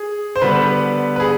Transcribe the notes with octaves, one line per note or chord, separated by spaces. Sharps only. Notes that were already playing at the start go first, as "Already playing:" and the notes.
Already playing: G#4
C5
D3 G3 B3 B4
B4
G#4